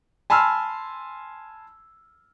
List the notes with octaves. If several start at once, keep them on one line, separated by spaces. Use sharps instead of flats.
G#5 A5 B5 C6 E6 F6